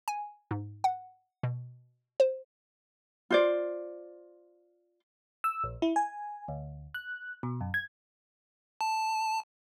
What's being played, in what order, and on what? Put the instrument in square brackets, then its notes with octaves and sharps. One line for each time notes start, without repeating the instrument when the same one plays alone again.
[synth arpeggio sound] G#5
G#2
F#5
B2
C5
[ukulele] F4 C5 D5
[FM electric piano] E6
A#1
E4
G#5
D2
F#6
B2
F#2
G#6
[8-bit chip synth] A5